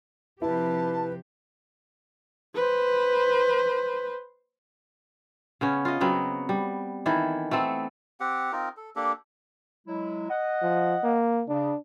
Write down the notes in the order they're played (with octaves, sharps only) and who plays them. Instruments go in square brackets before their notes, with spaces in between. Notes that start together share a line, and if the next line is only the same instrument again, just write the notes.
[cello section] C3 F3 G4 [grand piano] E4 [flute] B4 [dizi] A5
[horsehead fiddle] B4 C5
[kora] C#3 B3 C#4
F4 D#5
C#3 F#3 B3 C4
G3
D#3 E3 E4 A4
A3 B3 C4 A4
[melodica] C4 G4 F#5
C4 D#4 F4 A#4
A4
A#3 D4 G4 A4
[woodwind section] F#3 G#3 E4
D#5 F#5
[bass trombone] F3
A#3
[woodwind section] C#3 [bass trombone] D4